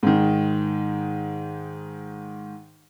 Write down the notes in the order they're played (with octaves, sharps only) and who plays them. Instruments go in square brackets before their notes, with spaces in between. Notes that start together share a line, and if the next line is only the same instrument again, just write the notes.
[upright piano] G#2 D#3